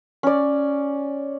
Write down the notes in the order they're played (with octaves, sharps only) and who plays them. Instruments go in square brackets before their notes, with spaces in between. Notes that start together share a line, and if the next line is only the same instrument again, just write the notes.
[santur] C#4 D5